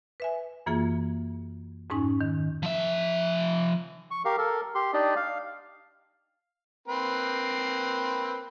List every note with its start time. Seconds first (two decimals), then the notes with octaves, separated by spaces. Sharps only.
0.20 B4 E5 G#5
0.66 F#2 E3 A#3 F4 G#4
1.90 F2 G#2 C#4 D#4 G#5 C#6
2.21 D#3
2.63 F3 E5
4.11 C#6
4.25 G4 A#4 F5
4.38 A4 A#4
4.75 G4 C6
4.93 D4 D#4 G4 D5 D#5
5.16 F5
6.88 A#3 C4 B4